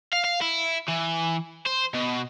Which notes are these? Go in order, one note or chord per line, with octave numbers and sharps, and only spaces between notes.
F5
F5
E4
E3
C5
B2